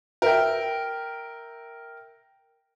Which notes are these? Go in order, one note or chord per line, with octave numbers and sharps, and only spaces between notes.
A#4 E5 G5